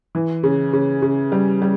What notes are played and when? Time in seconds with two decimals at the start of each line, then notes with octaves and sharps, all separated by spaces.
0.15 E3
0.43 C#3
0.73 C#3
1.02 C#3
1.32 G3
1.62 G3